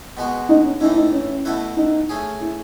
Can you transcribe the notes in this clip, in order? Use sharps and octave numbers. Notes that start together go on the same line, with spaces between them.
B2 G#3 B3 F#4
D#4
C#4
A2 E3 A3 D#4 E4
D#4
C#4
B2 A3 E4 B4
D#4
A3 C#4 G#4
E4